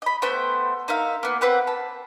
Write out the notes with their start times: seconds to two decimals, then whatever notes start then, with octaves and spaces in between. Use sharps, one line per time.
0.02 D#5 B5
0.22 A3 B3 C5 G5
0.88 D#4 A#4 E5 F5
1.23 A#3 B3
1.41 C4 B4 F#5 G5
1.67 A5 B5